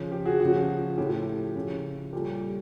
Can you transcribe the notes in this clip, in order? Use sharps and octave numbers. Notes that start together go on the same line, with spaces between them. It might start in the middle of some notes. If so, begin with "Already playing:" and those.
Already playing: C#3 F3
G4
F#4 G#4
C#3 F3 F#4
A2 F3 G4
C#3 F3
A#2 G3 G4 A4